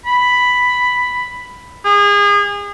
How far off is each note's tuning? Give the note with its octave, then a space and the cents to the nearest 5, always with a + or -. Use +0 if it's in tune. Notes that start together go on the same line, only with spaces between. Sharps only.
B5 +5
G#4 -30